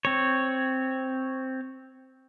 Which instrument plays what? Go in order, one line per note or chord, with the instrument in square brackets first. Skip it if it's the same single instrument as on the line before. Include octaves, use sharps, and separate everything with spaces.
[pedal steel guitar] C4 C#5